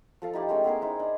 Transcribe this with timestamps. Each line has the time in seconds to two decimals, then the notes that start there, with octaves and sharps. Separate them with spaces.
0.22 F3 A4 F5
0.33 D#4 E4 G4 D5
0.49 G#3 A3 C#4 G5
0.64 B3 E4 G#4 A#4
0.81 D#4 E4 C5
0.99 D4